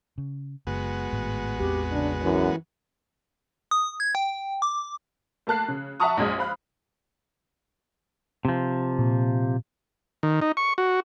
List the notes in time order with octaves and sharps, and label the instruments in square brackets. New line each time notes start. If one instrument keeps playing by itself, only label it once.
[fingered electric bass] C#3
[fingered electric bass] F#1 [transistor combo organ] G#3 B3 F#4
[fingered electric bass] G#1 A2
[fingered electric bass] A1 E2 C4 [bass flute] G4
[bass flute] C#3 [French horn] D4
[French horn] F#2 [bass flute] E3
[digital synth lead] D#6
G#6
G5
D6
[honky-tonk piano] A3 A#3 A5 F#6 C7
C#3
E5 F#5 A5 A#5 C#6 D#6
A#1 F#2 G#3
C5 F5 B5 F#6
[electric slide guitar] C3 F3
[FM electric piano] A#2
[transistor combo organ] D#3
D#4
C#6
F#4